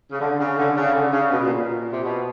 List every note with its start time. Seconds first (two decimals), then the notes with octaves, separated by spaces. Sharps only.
0.12 C#3
0.20 D3
0.39 C#3
0.57 D3
0.76 C#3
0.94 D3
1.12 C#3
1.31 B2
1.43 A#2
1.55 A#2
1.92 C3
2.04 B2